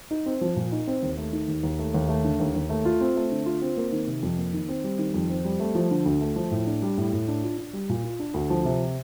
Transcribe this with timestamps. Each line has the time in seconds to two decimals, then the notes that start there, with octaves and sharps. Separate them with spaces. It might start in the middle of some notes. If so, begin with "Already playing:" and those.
0.11 D#4
0.26 C4
0.41 F3
0.56 A#2
0.72 D#4
0.87 C4
1.03 D#2
1.18 A3
1.33 D#3
1.48 D#2
1.63 D#2
1.79 A3
1.94 D#2
2.09 A3
2.25 D3
2.40 D#2
2.55 D#2
2.70 A3
2.85 F4
3.01 C4
3.16 A3
3.31 D3
3.46 F4
3.62 C4
3.77 A#3
3.92 D#3
4.07 C3
4.23 F2
4.38 A#3
4.54 D#3
4.68 C4
4.84 G3
4.99 D#3
5.14 F2
5.29 C4
5.45 G3
5.60 A3
5.75 F3
5.91 D3
6.06 D2
6.21 A3
6.36 F3
6.51 A2
6.67 D4
6.82 G3
6.98 A2
7.13 A2
7.28 D4
7.43 F4
7.58 D4
7.73 G3
7.90 A#2
8.04 F4
8.19 D4
8.34 D2
8.50 F3
8.65 C3